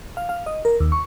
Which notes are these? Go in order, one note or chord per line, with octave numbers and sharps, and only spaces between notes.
F5
F5
D#5
A#4
D#2
C#6